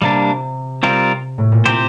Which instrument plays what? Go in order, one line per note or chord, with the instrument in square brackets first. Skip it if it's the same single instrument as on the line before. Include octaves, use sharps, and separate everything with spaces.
[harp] C3 [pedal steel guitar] G3 A#3 D4
[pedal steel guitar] G3 C4 F4 A#4
[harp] A2
A#2
[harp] C3 [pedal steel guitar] C4 G4 C5